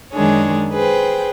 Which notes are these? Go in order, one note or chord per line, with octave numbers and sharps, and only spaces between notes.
F#2 D#3 G#3 D4 G#4 C#5
G#4 B4 C5 G5